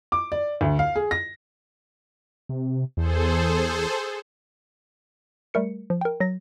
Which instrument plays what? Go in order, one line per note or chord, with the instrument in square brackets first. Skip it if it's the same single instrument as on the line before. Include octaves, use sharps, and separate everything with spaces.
[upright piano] D6
D5
D2
F5
G#4
A#6
[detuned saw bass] C3
[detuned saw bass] E2 [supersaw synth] G#4 A4 C5
[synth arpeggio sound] G3 A3 A#4 C#7
F3
A#4 G5
F#3 A#6